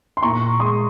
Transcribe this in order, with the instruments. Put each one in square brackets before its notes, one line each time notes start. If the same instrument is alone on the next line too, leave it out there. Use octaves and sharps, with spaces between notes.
[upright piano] C6
A#2 A#5 C#6
G#3 C6 D#6